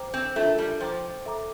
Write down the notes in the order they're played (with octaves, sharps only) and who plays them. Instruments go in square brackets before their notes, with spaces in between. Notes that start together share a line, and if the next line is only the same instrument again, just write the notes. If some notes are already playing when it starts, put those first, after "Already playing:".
Already playing: [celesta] C5 G5 A#5 D6
[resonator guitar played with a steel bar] C4
[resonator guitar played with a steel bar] A3 [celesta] D4 F4 A#4 E5 A5
[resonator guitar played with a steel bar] G3
[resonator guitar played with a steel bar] F3 [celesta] C5 G5 A#5 D6
[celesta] A4 E5 A#5 D6